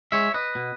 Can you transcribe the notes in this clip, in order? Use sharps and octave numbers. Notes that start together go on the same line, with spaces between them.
G#3 C#5 E5
B4 D#5
B2